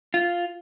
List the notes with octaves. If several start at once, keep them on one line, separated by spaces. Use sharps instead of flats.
F4